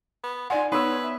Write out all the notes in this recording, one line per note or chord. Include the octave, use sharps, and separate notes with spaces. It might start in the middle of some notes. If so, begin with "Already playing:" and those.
B3
D#4 F4 D5 F#5 G#5
B3 D#4 B4 C#5 E6
E5